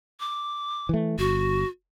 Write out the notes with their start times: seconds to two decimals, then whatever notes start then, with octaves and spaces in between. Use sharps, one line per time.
0.20 D6
0.89 E3 A3
1.19 G1 F#4